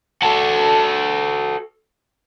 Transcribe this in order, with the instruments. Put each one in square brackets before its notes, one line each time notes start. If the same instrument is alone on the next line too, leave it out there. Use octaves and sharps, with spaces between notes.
[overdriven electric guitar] F#4 A4